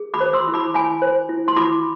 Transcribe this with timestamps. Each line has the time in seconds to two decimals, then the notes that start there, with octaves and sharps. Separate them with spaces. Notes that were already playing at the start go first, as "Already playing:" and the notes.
Already playing: G#4
0.14 B5 D6
0.20 C5
0.33 C6 E6
0.48 E4
0.54 B5 D6
0.74 E4 G#5 B5
1.02 C5
1.29 E4
1.48 C6
1.56 E4 B5 D6